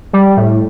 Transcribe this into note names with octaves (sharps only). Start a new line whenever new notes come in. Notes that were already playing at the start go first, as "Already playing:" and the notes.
G3
A2